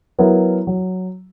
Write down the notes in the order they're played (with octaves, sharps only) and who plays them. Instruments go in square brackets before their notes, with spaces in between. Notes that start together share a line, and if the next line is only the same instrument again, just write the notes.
[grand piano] F#3 B3 E4 A#4
F#3